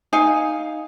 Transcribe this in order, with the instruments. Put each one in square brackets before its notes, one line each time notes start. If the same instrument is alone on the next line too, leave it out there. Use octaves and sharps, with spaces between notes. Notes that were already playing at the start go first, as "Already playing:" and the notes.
[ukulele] D#4 F5 G#5